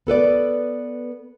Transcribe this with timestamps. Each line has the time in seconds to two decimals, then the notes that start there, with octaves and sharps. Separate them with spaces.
0.07 B3 A4 B4 D5